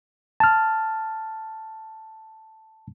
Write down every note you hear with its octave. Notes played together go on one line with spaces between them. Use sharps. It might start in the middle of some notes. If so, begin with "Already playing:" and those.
A5 F6